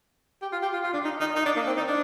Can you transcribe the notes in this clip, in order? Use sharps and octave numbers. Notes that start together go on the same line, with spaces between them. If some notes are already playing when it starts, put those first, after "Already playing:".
G4
F4
G4
F4
F4
D4
D#4
D#4
D#4
D4
A#3
C4
D#4
D4